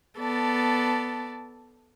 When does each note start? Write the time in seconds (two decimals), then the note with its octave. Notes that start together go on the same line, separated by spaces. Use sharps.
0.18 B3 A4 D5 A5